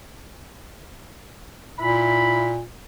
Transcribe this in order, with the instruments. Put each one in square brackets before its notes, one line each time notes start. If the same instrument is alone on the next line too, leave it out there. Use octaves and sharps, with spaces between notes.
[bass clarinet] A#2 [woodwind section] E4 B5